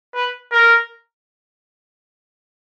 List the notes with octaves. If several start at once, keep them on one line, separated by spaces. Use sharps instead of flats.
B4
A#4